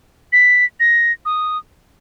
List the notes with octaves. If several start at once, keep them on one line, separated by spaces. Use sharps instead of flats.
B6
A#6
D#6